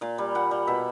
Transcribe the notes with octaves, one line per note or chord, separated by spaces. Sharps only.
A#2 F5
G3
A#2 F#5
G3
B2 E5